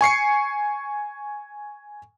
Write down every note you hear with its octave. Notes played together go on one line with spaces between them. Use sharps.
G#5 C#6 C7 C#7